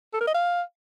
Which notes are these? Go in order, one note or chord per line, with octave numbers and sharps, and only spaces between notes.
A4
A#4
D#5
F5